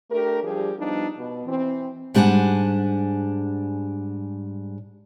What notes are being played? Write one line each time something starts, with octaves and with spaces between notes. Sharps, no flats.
A3 D4 G4 A#4
F3 G3 D4 G4 G#4
F3 G3 B3 D4 D#4
B2
E3 C4
G#2 G3 D4 E4 F#5 G#5